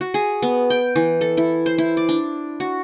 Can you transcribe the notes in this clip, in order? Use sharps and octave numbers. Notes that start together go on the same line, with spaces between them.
F#4
G#4
B3
G5
E3
A4
E4
C5
E4
D5
D4
F#4